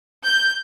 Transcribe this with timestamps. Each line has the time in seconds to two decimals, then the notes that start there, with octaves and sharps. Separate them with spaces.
0.24 G6